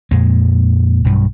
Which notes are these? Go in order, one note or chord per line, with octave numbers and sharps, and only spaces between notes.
F2 A#2 G#3
B1 G2